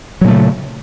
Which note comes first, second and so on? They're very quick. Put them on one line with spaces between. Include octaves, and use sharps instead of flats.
F#3 A#2 A3 C#3